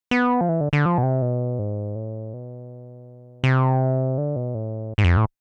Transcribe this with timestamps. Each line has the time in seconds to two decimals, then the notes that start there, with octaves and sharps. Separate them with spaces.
0.11 B3
0.41 F3
0.49 E3
0.61 D3
0.73 D3
0.86 F3
0.98 B2
1.03 C3
1.22 B2
1.59 G#2
1.95 A2
2.34 B2
3.44 C3
4.18 D3
4.36 B2
4.55 A2
4.98 G#2
5.04 F2
5.17 A2